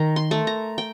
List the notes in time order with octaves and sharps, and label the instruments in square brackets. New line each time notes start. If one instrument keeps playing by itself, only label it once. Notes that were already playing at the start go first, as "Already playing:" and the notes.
Already playing: [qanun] D#3 A#5
C6
A3
A#5
G5